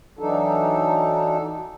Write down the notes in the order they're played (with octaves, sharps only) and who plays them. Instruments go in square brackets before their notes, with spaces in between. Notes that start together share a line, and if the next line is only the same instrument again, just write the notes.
[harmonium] E3 F#3 D4 D#4 A4